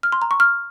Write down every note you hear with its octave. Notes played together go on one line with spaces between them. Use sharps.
F6
C6
A#5
C#6
F6